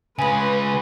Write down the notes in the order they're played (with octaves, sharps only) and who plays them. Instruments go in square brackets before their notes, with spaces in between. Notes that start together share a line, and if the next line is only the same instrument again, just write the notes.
[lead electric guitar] C#3 G#3 [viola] B4 [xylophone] G#5 B5